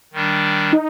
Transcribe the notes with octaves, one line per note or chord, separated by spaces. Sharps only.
D#3 G3 D4
D#4